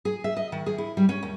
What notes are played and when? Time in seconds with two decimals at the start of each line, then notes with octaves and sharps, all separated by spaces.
0.05 G#4
0.24 E5
0.37 D#5
0.52 D#3
0.66 G#4
0.78 E4
0.97 G3
1.09 C#4
1.23 D#2